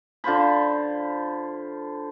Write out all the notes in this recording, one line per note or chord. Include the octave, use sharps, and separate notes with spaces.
D3 F4 C5 B5